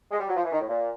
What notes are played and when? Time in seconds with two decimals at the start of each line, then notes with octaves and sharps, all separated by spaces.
0.11 G#3
0.20 G3
0.29 F#3
0.36 F3
0.44 E3
0.52 D#3
0.61 A2
0.68 A#2